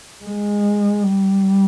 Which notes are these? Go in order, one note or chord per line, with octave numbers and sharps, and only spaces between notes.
G#3
G3